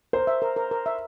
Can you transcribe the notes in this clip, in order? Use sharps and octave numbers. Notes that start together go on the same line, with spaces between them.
A#4 C5
E5
A#4
A#4
A#4
E5